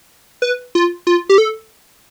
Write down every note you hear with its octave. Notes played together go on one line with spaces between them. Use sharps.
B4
F4
F4
G4
A4